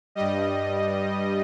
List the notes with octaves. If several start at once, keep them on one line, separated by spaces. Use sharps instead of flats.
G2 G3 D#5